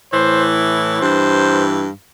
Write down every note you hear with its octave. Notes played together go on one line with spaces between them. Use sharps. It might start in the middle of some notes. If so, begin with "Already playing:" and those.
A2 E3 C5
G2 E3 C5